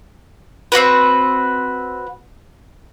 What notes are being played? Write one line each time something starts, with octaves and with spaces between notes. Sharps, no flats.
C4 C#4 F#4 B4